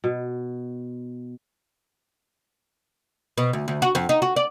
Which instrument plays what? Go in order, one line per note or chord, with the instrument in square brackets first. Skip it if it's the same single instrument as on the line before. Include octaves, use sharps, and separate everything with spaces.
[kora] B2
[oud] B2
D2
D2
F#4
F2
D#4
F#4
D5